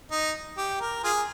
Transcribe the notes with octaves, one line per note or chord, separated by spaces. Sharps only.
D#4
G4
A#4
F4 G#4